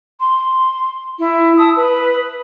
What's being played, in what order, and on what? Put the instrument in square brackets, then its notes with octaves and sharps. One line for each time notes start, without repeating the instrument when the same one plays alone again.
[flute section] C6
E4
A5 D#6 E6
B4